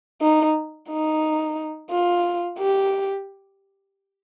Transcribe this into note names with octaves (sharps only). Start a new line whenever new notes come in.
D#4
D#4
F4
G4